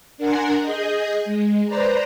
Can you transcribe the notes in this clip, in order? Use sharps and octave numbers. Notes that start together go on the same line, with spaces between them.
D4 A#4 F#5 G#5 A#5 C6
G#4 D#5 G6
G#3
B4 C5 D5 A#5